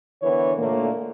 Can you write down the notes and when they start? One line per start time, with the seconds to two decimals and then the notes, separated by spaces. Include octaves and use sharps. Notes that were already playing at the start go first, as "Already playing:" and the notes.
0.22 D3 E3 B3 A#4 C#5
0.58 A#2 D3 A3 A#3